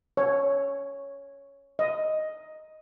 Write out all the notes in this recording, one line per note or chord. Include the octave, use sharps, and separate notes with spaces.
C#5
D#5